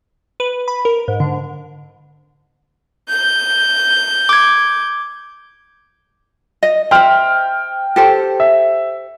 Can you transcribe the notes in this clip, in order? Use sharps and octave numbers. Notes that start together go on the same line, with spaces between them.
B4
B5
A#4
G#2
D3
G6
D6 G#6
D#5
C5 E5 G5 F6
G4 A4 C5
E5